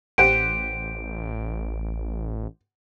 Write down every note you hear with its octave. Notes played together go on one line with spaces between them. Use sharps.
A1 G4 C5 F#5 D7